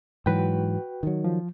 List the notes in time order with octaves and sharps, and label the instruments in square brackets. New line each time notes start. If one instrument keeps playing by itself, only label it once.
[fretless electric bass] G#2 E3 F#3 [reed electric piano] F#4 B4 G5
[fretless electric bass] D#3 F#3
[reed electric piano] F3